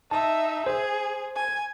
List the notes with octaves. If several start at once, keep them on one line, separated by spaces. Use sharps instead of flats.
D#4 E5 A5
G#4 C5
G#5